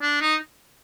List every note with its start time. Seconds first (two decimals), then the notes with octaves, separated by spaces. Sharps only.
0.02 D4
0.21 D#4